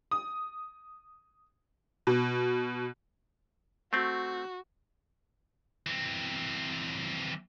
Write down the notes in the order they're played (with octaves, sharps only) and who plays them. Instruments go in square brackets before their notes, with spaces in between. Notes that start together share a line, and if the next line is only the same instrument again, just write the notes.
[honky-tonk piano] D#6
B2
[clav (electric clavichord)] A3 C4 [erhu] F#4
[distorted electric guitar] E3 C4